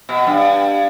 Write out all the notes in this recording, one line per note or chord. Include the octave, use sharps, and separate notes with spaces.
B2
G2